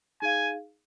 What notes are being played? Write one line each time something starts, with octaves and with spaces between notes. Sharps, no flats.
D#4 G#4 F5 G#5